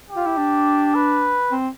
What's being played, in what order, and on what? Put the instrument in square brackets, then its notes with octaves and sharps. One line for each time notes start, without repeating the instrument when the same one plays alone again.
[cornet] G4
[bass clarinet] F4
E4
D4
[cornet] B4
[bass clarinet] C4